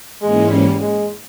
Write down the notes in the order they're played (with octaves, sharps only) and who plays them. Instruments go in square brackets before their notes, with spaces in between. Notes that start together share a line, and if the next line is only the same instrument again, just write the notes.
[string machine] G#2 E3 A#3 C#4 [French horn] G#3
[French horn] G3
G#3